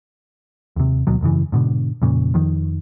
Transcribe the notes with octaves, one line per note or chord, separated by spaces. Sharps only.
D#2 C3
D2 B2 F#3
E1 F#2 C#3 E3
G#2 B2 D3
F2 A#2 C#3
F2 D#3